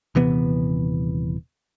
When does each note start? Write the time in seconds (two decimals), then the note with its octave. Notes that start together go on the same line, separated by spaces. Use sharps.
0.15 D#1 C3 E3 B3